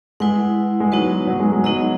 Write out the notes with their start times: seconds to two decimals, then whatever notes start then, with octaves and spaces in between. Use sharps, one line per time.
0.20 G#3 E4 B4 F#5
0.80 G#3
0.92 F#3 B3 D#4 F#4 B4 F#5
1.27 F#3
1.40 G#3
1.52 G#3
1.64 F#3 B3 D#4 G#4 D#5